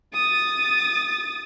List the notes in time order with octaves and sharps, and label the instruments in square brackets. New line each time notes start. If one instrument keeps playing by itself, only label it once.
[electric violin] D#6 A6